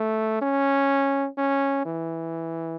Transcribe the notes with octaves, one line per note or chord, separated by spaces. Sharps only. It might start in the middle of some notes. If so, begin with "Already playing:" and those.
Already playing: A3
C#4
C#4
E3